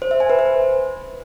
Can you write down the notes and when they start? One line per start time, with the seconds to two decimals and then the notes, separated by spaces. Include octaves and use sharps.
0.02 C5
0.11 E5
0.20 G#5
0.30 B4
0.39 C5